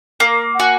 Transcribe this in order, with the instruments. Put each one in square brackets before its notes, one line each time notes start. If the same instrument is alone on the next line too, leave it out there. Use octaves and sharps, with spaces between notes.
[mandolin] A#3
[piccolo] F#5
[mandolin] F#4 [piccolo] G#5